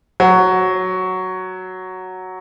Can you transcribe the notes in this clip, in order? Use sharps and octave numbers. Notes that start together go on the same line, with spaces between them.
F#3